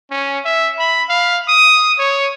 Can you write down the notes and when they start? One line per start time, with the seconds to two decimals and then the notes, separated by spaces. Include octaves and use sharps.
0.11 C#4
0.45 E5
0.79 B5
1.09 F5
1.48 D#6
1.99 C#5